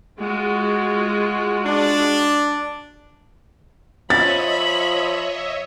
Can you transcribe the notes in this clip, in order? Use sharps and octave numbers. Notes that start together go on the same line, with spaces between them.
G#3 F4 F#4
D4
F3 C#5 D#5 E5 B5 A6